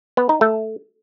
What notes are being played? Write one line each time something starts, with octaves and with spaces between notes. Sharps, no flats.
B3
D#4
A3